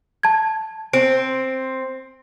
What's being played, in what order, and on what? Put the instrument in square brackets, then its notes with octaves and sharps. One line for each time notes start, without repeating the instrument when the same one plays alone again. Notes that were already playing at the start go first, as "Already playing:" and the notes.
[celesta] A5 G#6
[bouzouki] C4 [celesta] D7